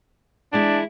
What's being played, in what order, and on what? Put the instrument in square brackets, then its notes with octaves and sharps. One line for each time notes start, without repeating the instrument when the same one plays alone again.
[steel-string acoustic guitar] E3 G#3 E4 [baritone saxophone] D4